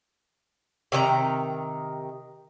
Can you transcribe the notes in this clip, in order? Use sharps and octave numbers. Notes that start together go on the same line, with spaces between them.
C3 D#3 B4 A#5